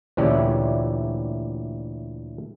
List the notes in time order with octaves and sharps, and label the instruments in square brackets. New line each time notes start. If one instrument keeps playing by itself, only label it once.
[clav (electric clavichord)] D2 A#2 E3 C#4 G4 D5